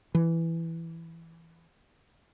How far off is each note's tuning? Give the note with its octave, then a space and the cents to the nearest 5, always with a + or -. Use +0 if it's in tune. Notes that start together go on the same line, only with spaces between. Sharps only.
E3 +5